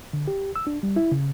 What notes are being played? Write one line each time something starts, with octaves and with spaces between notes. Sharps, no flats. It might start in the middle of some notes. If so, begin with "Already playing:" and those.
D3
G4
E6
D4
G3
E4
C#3